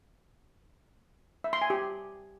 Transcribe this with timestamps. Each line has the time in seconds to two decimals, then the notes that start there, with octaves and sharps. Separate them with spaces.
1.44 E5
1.53 C6
1.62 G#5
1.70 G4